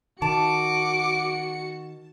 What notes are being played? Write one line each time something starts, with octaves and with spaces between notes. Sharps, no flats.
D#3 F#4 A5 D6 C#7